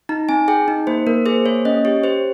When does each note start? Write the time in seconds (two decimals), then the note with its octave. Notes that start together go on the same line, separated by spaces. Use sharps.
0.09 D#4 A#5
0.29 C4 G#5
0.48 G#4 G5
0.68 D#4
0.87 A#3 C5
1.07 A#3 A#4
1.26 G#4 C5
1.46 A#3 C#5
1.65 C#4 D#5
1.85 G4 C#5
2.03 G4 C5